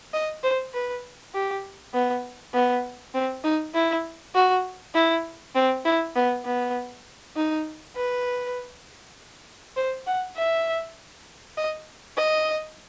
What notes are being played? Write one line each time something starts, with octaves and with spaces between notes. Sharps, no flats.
D#5
C5
B4
G4
B3
B3
C4
D#4
E4
F#4
E4
C4
E4
B3
B3
D#4
B4
C5
F#5
E5
D#5
D#5